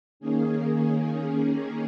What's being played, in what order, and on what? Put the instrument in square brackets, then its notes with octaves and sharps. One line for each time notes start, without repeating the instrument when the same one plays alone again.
[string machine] D#3 A#3 C#4 G#4